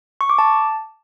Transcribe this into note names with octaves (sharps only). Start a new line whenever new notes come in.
C#6
D6
A5